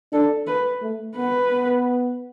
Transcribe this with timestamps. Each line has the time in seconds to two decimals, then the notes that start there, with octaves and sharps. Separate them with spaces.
0.12 D4 A4
0.47 B4
0.82 A3
1.16 B3 B4
1.50 B3